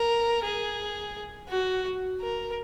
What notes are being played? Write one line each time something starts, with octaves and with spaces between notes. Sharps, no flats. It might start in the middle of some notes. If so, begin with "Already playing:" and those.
Already playing: A#4
G#4
F#4
A#4